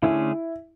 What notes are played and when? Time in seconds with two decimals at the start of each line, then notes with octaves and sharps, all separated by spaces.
0.02 D3 A3 C#4 E4 G#4